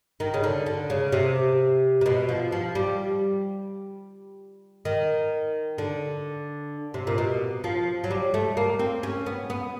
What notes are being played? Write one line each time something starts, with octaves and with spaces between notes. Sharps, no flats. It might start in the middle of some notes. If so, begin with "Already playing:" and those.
D#3
C#3
D3
D3
C#3
C3
C3
B2
F3
F3
G3
D#3
D3
C3
A#2
B2
F3
F#3
G3
A3
A#3
C4
C#4
B3
B3